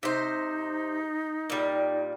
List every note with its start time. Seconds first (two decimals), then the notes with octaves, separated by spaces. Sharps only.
0.03 C3 D#4 C5
1.50 A#2 G3